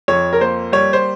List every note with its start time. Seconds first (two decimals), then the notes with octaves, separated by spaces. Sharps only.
0.08 F2 C#5
0.33 A#4
0.40 A#3 C5
0.72 G3 C#5
0.93 C5